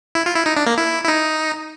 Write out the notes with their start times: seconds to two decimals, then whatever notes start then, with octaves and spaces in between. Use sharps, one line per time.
0.15 E4
0.26 F4
0.36 E4
0.46 D#4
0.57 D4
0.66 A#3
0.78 E4
1.04 E4
1.08 D#4